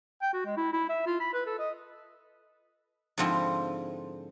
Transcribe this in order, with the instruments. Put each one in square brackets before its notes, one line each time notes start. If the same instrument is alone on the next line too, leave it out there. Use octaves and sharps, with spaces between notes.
[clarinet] G5
F#4
G#3
E4
E4
E5
F4
B5
B4
A4
D#5
[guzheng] G#2 D3 F3 C4 E4